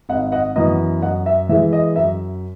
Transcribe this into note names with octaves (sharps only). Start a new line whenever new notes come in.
G#1 D#5 F#5
D#5 F#5
F#2 E3 B3 D#5
F#2 D#5 F#5
E5
E3 G#3 E5
D#5
F#2 E5